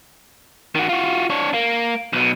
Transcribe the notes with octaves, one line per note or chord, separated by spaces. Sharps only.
D#3 F#4
F4 F#4
D4 C#5
A#3
B1 B2